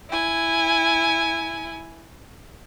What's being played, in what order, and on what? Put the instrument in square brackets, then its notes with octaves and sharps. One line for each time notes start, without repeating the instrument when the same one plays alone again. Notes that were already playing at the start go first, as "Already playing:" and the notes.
[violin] E4 G#5